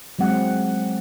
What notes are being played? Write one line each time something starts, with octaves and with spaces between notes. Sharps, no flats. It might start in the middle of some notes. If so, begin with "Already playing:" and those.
F#3 G#3 C4 F#5